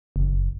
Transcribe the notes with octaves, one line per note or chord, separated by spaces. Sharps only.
F#1